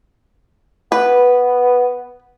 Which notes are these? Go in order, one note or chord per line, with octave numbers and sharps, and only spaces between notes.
B3 B4